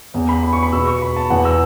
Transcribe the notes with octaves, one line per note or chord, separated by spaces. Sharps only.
E2 E3 B3
B5
B5
C#6
B5
B2 B3 E6
C#6
B5
A5
E2 E3 B3 F#5
E6